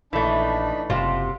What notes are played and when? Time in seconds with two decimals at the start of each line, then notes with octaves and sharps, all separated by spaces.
0.13 A#1 E3 A3 D4 D#4 B5
0.90 F#1 C3 C4 F4 F#4